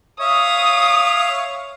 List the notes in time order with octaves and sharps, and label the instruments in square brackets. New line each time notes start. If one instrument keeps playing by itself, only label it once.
[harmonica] C#5 E5 F5 [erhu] D#6